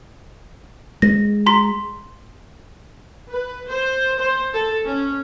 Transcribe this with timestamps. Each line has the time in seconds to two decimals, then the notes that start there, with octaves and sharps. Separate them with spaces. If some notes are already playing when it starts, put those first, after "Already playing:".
1.02 G#3 A#6
1.46 A#5 C6 B6
3.31 B4
3.69 C5
4.19 C5
4.53 A4
4.86 C#4